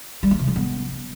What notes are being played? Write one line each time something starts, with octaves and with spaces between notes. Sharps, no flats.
G3
A#3
C3
F3
B3